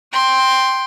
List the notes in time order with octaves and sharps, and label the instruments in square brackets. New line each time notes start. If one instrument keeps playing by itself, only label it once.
[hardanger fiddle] G5 C6